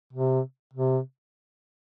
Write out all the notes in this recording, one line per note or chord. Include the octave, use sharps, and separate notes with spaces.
C3
C3